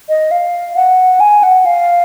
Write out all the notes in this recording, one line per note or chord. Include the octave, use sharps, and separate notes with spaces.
D#5
F5
F#5
G#5
F#5
F5